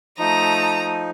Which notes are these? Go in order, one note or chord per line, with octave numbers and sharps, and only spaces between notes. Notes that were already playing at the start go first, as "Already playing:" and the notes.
F3 A3 D#4 A#5 D#6